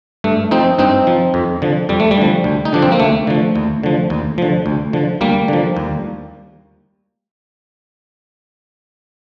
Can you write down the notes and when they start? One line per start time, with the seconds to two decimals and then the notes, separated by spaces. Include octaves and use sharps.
0.24 G2 A3
0.51 F3 C4 D#4
0.78 G2 C4 D#4
1.07 F3
1.34 F2
1.62 D3 F3
1.89 F2 G3
2.00 A3
2.11 G3
2.17 D3 F3
2.44 D2
2.65 D#4
2.73 D3 F3 D4
2.82 C4
2.92 A#3
3.00 D2 A3
3.27 D3 F3
3.56 D#2
3.83 D3 F3
4.10 D#2
4.38 D3 F3
4.66 D2
4.93 D3 F3
5.21 D2 G3 A#3
5.48 D3 F3
5.77 D#2